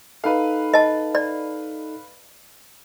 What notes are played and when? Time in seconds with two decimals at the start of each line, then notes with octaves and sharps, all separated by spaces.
0.24 D#4 A4 B4 F5
0.74 D#5 A5
1.15 D5